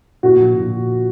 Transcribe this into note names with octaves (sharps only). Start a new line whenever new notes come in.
A#2 F#4
F3
A#2